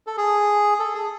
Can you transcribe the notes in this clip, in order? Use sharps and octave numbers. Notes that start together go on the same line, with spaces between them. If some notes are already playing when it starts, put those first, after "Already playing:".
A4
G#4
A4
G#4